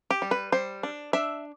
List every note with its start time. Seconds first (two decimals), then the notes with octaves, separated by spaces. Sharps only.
0.11 G4
0.22 G3
0.31 B4
0.52 G3 C5
0.83 D4
1.13 D4 E5